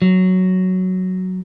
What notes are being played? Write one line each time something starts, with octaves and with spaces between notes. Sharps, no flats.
F#3